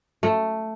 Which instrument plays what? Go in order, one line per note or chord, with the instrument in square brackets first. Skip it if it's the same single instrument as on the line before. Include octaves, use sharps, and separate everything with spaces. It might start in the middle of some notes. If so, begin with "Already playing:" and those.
[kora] A3